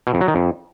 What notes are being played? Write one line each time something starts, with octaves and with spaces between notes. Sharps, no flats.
B2
F2
F#3
D#3
F2